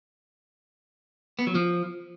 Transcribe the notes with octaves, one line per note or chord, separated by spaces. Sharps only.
B3
F#3
F3